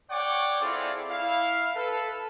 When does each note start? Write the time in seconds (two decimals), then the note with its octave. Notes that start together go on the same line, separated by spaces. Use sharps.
0.10 C#5 D5 F#5 G5 C#6 D6
0.61 C4 E4 F4 G#4 A4 D5
1.10 E4 F5
1.76 A4 B4